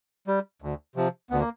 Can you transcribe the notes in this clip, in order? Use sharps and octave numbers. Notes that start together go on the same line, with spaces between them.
G3
D2
C3 F3
D2 B3
A#3